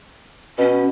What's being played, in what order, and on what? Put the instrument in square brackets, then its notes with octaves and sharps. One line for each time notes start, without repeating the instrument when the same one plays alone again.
[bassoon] B2 [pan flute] C#4